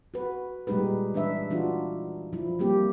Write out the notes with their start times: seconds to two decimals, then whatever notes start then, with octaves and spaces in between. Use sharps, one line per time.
0.14 F#4 B4
0.67 A#2 G3 G#3 D#4 G4 B4
1.14 E3 D4 B4 E5
1.50 E3 D4 D#4 F4 F#4
2.33 F3 E4
2.59 G3 A#3 C4 G4